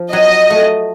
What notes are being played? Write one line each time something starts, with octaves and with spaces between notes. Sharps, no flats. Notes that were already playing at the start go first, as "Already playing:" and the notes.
Already playing: F3
F#3 D#5
A3